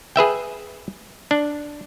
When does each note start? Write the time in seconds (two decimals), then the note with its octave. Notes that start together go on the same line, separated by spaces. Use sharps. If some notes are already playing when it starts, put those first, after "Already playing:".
0.16 G#4 B4 E5 G5
1.31 D4